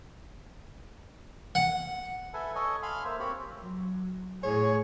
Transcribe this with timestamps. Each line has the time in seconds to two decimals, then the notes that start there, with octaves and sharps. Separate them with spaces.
1.55 F#5
2.34 A4 B4 E5 G#5
2.55 A4 C#5 D#5 G#5
2.83 F5 G#5 B5 C6 F6
3.05 A#3 C5 E5
3.20 C4 G4 C#5 B5
3.59 F#3
4.43 A2 G#4 C#5